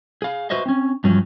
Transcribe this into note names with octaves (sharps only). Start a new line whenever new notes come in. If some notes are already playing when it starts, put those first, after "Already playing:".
G#4 F5
F#4 B4 C5 D#5 E5
C4 C#4
G2 F3 F#3 C#4